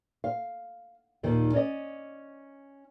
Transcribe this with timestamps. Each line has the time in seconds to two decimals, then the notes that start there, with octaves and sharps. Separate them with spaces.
0.24 F5
1.23 D#2 A#2 D#3 F3 D#4
1.53 C#4 D5 D#5